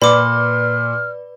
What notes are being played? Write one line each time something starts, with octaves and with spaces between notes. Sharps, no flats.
A#2 B4 D5 B5 D6 F6